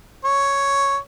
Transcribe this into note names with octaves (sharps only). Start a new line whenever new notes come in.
C#5